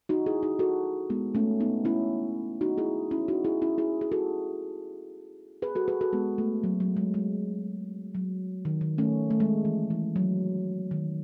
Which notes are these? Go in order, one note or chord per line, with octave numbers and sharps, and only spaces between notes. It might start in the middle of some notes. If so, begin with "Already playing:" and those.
D#4 F#4
E4 G#4
D#4 F#4
F#4 A4
G#3 B3
A3 C#4
B3 D#4
C#4 E4
D#4 F#4
E4 G#4
C#4 E4
D#4 F#4
E4 G#4
C#4 E4
E4 G#4
G#4
F#4 A4
G#4 B4
F#4 A4
G#4 B4
F#4 A4
G#3 B3
A3
F#3
F#3
G#3
G#3
F#3
D#3
D#3
A3 C#4
A3
G#3
E3
E3
F#3
D#3